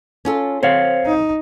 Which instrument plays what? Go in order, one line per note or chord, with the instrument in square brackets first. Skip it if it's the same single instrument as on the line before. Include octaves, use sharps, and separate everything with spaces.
[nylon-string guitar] C#4 F4 A4
[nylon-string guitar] C4 [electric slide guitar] C5 C#5 F5
[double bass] D#4